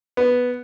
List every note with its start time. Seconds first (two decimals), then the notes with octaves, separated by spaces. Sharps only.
0.17 B3